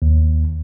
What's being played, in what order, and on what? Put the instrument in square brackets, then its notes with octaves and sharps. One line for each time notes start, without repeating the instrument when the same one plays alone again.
[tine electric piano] D#2